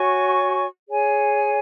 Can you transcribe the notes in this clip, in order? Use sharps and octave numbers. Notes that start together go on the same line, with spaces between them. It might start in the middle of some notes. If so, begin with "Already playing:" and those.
Already playing: F#4 C#5 G#5 C#6
G#4 C#5 G#5